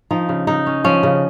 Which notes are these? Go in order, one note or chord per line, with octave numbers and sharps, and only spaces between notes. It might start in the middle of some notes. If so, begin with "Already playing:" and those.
F3 D#4
C#3
C#3 D#4
C#4
F3 C#4
C#3